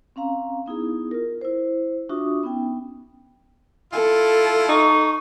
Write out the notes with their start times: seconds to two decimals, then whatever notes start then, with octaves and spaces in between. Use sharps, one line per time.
0.16 C4 C#4 F5 A#5
0.66 B3 D#4 E4 G#4
1.11 F4 A#4
1.41 E4 C5
2.09 D4 F4 F#4 E5 C#6 D#6
2.43 B3 C#4 D#4 G5
3.93 E4 F4 A4
4.69 D#4 C#6